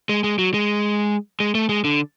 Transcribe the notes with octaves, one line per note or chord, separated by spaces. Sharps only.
G#3
G#3
F#3
G#3
G#3
A3
G#3
D3